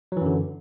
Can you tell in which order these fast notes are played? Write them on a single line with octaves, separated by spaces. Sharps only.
F#3 E3 F#2 D3